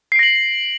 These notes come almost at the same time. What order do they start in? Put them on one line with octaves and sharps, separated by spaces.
C7 D7 A#6 F#7